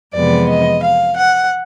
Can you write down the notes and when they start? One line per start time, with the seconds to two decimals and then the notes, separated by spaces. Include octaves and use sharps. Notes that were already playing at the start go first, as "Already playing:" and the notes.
0.14 F2 C3 E3 G#3 B3 D5
0.49 D#5
0.82 F5
1.16 F#5